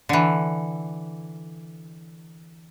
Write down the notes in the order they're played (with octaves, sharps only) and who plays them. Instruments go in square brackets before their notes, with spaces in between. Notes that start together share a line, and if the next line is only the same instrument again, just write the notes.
[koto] D3 E3